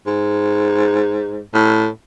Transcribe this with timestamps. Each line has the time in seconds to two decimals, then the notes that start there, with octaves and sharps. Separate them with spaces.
0.07 G#2
1.54 A2